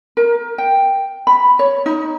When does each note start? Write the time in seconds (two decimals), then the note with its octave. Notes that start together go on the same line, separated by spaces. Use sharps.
0.17 A#4
0.58 G5
1.27 B5
1.59 C#5
1.86 D#4